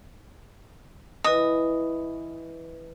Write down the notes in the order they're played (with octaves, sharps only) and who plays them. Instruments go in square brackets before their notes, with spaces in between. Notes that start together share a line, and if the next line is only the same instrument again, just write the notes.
[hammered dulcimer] E3 [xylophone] B4 D#5 [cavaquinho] D#6